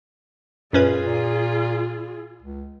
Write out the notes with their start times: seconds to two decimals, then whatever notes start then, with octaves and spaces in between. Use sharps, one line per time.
0.73 F#2 A#2 C#4 F4 G#4 B4
1.03 A#2
2.42 C#2